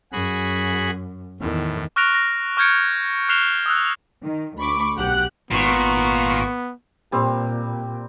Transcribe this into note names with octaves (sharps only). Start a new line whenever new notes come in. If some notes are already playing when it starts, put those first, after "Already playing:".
F#2 F#4 G#4 B5
E2 A2 D#3
C#6 F6 F#6 A#6 D7 F7
A#6
C#6 F6 G6 G#6 C#7 D7
F6 F#6 C7 E7 F7 G7
D#6 E6 F#6
D#3
D2 B5 C#6 D6
B1 G4 F#5 F#6
G#1 A#2 B3 C#6
A#2 G3 C4